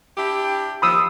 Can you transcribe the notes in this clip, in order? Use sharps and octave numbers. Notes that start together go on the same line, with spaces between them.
D4 E4 G4
D#2 D#3 F3 B5 D#6 E6